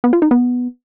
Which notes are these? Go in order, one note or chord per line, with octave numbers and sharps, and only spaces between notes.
B3
F4
D#4
B3